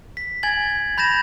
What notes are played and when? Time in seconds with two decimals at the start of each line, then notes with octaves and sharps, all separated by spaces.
0.17 B6
0.43 G#5 G#6 A6 F#7
0.98 B5 G6 A6 A#6 E7